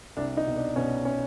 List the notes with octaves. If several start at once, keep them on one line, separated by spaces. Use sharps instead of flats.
C2 D4
D#4
B2
D4
B2 C#4
C#4